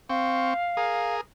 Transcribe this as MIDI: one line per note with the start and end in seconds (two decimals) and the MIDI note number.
0.09 0.54 60
0.09 1.15 77
0.09 0.54 79
0.09 0.54 85
0.77 1.21 68
0.77 1.21 70
0.77 1.21 87